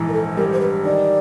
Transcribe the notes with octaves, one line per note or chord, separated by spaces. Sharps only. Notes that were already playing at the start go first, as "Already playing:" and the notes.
Already playing: A#1 G#2 E3
A#4
A4
G3 A#4
C5
B4
D#3 D5